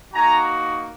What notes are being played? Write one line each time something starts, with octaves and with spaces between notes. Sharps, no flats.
A#3 D#4 F#4 G#5 A#5